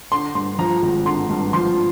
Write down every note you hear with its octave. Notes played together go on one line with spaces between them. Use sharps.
D3 C6
G2 C6
F3 A#5
G#1
D3 C6
G2
F3 C6